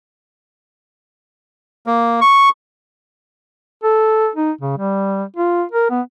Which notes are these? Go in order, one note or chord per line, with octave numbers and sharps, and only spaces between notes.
A#3
C#6
A4
D#4
C#3
G3
F4
A#4
B3